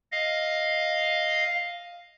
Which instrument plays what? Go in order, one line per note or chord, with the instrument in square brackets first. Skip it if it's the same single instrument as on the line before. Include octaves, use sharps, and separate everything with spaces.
[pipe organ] D#5 F5